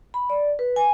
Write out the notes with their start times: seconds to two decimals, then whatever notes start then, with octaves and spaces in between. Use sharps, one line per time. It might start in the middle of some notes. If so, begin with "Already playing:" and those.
0.14 B5
0.30 D5
0.59 B4
0.76 G#5